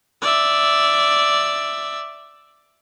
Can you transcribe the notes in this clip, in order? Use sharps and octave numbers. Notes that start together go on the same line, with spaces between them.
D5 E5